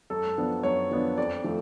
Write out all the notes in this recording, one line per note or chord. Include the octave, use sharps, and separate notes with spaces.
F#2 A4
F3 B3 D4
F#2 C#5
F3 B3 D4
F2 D5
F3 A3